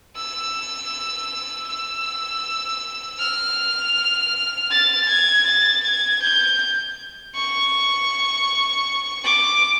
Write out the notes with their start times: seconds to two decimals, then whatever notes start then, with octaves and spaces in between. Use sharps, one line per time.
0.16 E6
1.67 E6
3.19 F6
4.71 A6
5.09 G#6
5.46 A6
5.83 G#6
6.22 G6
7.35 C#6
9.24 D6